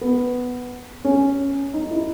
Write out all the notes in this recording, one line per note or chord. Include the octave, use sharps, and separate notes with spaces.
B3
C#4
D#4
E4